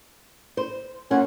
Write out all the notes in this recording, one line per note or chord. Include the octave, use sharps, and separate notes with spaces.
C5
A#3 C#4 F4 F#5